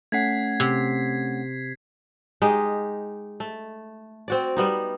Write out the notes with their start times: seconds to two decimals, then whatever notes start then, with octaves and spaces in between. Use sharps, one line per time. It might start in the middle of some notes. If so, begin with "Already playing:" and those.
0.12 A3 C#4 F#5 G#6 B6 C7
0.60 C3
2.42 G#3 D#4 G4
3.40 A3
4.28 C4 F#4 D5
4.57 G3 B3 D#4